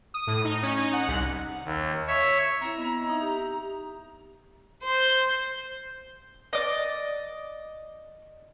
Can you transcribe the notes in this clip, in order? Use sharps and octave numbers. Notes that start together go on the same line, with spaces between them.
D#6
A2
D#4
C#4
D#4
F#5
C2
D#2
C#5 E5
C4 E4 A#5
B3 D#5 E6
D#4 E5
G4
C5
D5 D#5